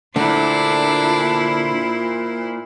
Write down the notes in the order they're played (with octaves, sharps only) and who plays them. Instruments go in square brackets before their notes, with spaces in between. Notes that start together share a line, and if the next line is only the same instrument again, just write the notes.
[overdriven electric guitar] A#2 [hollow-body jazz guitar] D3 A3 [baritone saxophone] D4 [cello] E4 C5